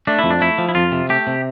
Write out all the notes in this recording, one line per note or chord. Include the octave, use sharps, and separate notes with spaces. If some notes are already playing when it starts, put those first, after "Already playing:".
A3 D4
E4
F2
D4
A3 E4
F3
E4
F2 F4
C3
A3 G4
C3